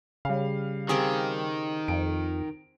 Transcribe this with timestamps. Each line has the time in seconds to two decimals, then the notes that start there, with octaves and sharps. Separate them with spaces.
0.25 C#3 G3 F5
0.89 D#3 C4 G4 G#4
1.88 F2 D7